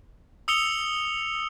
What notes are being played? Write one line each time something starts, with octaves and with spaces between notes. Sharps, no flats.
D#6 E6 C#7 F7 G7